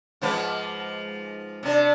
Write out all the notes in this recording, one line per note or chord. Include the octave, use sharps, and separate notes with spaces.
G#2 F3 B4
C3 D4